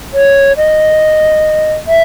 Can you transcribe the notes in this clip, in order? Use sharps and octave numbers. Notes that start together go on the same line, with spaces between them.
C#5
D#5
E5